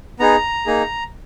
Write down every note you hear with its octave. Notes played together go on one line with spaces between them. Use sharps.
B3 D#4 G#4 A#5
A#3 D#4 G#4